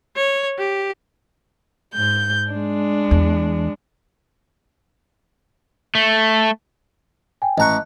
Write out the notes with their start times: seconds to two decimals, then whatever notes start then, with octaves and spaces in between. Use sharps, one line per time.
0.16 C#5
0.58 G4
1.94 G#2 G6
2.51 G#3 D4
3.11 E2
5.95 A3
7.42 G5 G#5
7.58 A1 D#5 A5 A#5 C#6 F#6